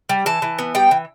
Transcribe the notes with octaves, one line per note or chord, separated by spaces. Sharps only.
G3
E3 A5
E3
B3
G3 G5
E3